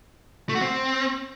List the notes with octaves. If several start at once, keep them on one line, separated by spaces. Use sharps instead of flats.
A3
F#4
C4